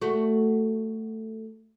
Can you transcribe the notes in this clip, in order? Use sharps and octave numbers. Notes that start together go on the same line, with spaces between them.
A3 F#4